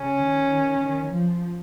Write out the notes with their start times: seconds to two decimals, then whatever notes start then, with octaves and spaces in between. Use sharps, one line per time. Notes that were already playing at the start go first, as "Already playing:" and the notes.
Already playing: C#3 C#4
0.22 D#3
0.81 D#3
1.11 F3